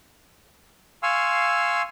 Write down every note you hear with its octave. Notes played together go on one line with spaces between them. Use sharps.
F5 G#5 C6 C#6 E6